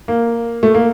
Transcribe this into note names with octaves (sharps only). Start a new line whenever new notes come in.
A#3
A3
A#3